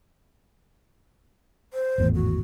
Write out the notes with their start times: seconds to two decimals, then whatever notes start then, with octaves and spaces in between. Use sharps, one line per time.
1.73 C5
1.98 G#1 E2 A2
2.15 F#4